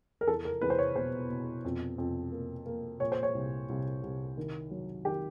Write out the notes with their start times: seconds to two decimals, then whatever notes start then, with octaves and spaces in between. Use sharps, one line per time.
0.21 A#4
0.27 E2 A4
0.45 A#4
0.61 E2 B4
0.70 C5
0.79 C#5
0.96 B2 C5
1.30 B2
1.65 F2
1.98 F2
2.32 A#3
2.66 A#3
3.00 A#2 C#5
3.12 C5
3.23 C#5
3.35 C2
3.69 C2
4.03 C2
4.37 D#3
4.71 F#3
5.05 D#3 G4